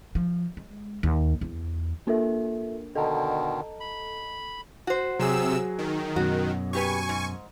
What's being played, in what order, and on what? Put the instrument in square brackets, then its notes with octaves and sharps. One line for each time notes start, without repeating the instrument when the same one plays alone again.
[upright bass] F3
G#3
D#2
E2
[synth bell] A#3 D4 A#4 [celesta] F4 A4 E5
[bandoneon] B2 D3 D#3 [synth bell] A4 [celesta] D#5 A5 A#5
[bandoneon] B5
[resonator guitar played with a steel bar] F#4 C5
[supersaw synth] C3 E6 [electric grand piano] F#3 G#4
[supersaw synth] D#3
[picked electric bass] F#2 B2 [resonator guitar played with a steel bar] F#4
[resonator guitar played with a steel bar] A#2 G4 B4 [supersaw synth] G#5 C#6
[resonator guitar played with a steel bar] G#2